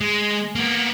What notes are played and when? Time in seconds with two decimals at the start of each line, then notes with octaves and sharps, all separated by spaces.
0.01 G#3
0.56 A#3 B3